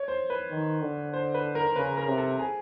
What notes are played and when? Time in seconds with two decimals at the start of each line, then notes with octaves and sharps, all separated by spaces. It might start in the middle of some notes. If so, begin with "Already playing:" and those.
Already playing: C#5
0.08 C5
0.30 B4
0.50 D#3
0.81 D3
1.13 C5
1.34 B4
1.55 A#4
1.76 C#3 B4
1.97 A#4
2.08 C3
2.18 A4
2.39 G#4